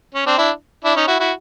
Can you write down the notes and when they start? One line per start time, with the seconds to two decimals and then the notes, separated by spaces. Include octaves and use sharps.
0.15 C#4
0.26 C4 D4
0.38 D4 E4
0.85 D4 E4
0.96 C#4 D#4
1.07 E4 F#4
1.20 E4 F#4